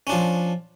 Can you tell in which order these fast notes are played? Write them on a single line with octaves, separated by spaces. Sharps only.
C#4 D4 F3